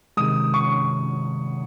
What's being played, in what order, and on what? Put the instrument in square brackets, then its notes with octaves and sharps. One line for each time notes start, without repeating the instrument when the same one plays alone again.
[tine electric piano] C3 D#3 G#3 [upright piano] D#6
[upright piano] C#6